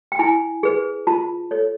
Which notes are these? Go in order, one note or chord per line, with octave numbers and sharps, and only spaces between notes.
G5
E4 G#5
G#4 B4
F4 A5
A4 C#5